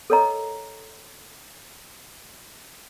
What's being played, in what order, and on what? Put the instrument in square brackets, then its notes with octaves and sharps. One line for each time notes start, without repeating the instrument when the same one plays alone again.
[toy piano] A4 A#4 C#5 D#5 A#5